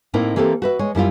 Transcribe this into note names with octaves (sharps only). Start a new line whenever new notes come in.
A2 A#3 C4 D#4 E4
E3 A#3 C4 G4 A4
F#4 B4 E5
G#3 C#5
F#2 G3 E4 F4